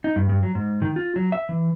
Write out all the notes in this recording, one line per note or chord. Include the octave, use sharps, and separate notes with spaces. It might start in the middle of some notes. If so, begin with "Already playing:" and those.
D#4
G2
G2
F#3
G#2
D#3
F4
F#3
E5
E3